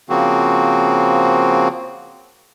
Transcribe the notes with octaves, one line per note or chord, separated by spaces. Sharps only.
C#3 F3 A#3 C4 F#4